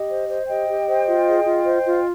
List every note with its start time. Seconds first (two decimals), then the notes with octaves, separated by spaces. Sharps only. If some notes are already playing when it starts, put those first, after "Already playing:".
Already playing: G4 D#5
0.09 C5
0.29 C5
0.48 G4 D#5 G5
0.67 G4
0.87 C5
1.07 F4
1.26 G#4
1.46 F4
1.65 C5
1.84 F4